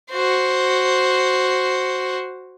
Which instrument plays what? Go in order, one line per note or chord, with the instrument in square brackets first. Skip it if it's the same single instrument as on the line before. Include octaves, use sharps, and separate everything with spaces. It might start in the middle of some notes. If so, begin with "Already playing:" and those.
[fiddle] F#4 C5